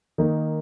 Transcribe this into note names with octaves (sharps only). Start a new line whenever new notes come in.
D#3 A#3 D#4